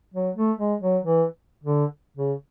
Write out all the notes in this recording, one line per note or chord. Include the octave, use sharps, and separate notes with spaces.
F#3
A3
G#3
F#3
E3
D3
C#3